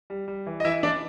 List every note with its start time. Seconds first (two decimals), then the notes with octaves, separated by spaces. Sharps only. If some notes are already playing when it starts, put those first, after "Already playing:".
0.10 G3
0.28 G3
0.46 E3
0.60 D#5
0.65 E3 E4 E5
0.83 E3 D4 D5